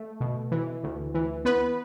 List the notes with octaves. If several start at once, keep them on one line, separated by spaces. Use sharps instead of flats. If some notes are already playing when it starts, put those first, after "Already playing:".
Already playing: A3
B2
E3
D2
E3
B3 B4